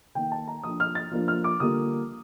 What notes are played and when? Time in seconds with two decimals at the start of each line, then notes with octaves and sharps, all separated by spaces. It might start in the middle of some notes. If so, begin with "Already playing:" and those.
0.15 D#3 A#3 D#4 G5
0.32 A5
0.47 A#5
0.63 F3 A#3 D4 F4 D#6
0.80 F6
0.95 A6
1.11 F3 A#3 D4 F4
1.28 F6
1.44 D6
1.60 D3 G3 A#3 F4 D#6